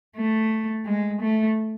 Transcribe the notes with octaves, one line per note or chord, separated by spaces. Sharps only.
A3
G#3
A3